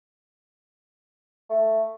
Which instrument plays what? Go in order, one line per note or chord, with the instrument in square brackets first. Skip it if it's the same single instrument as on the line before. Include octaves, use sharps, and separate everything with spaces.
[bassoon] A3